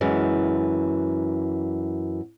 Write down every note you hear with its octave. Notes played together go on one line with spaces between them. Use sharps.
F#2 E3 G#3